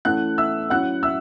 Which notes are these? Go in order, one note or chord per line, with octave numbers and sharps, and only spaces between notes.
E3 A3 C#4 E4 F#5 F#6
E5 E6
F#3 C#4 E4 F#5 F#6
E5 E6